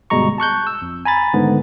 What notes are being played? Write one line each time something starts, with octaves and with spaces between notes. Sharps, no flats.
G1 B2 G3 G#3 A#5 C#6
A5 C#6 F#6 G6
E6
F2
G#5 A#5 B5 A6
G#2 D3 D#3 A3 B3